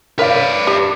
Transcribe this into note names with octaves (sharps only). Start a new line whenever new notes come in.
A#4 B4 C#5 D5 F5
G4